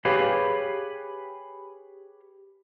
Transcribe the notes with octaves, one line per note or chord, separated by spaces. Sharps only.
G4 G#4 B4 C#5 F5